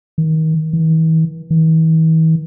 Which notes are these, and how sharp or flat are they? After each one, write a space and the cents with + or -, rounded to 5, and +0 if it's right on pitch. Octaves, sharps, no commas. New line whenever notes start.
D#3 +25
E3 -45
E3 -45